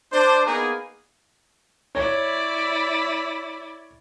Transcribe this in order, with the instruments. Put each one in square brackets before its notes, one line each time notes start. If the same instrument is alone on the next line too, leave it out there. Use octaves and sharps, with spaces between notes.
[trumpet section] D4 C5
A#3 B3 D#4 G#4
[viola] E4 D5 [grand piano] C#5